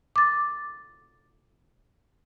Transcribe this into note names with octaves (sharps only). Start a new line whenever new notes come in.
D6 A6